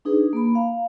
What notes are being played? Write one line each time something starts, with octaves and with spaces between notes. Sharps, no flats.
D4 D#4 G#4 B4
A#3 B5
F5 A#5